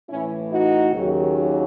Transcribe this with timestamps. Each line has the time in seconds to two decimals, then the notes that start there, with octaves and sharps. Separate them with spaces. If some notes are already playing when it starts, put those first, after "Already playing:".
0.09 A2 E3 C#4 E4
0.51 D#4 F#4
0.94 D#2 C#3 F#3